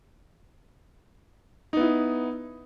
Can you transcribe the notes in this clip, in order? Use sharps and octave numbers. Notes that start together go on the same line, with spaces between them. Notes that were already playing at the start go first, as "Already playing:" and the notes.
B3 D#4 E4